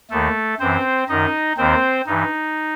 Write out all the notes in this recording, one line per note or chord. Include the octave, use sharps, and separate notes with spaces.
D#2 D#3 A3 A4
F#2 E3 C4 C5
F#2 D#3 D#4 D#5
D#2 D#3 C4 C5
G2 E3 D#4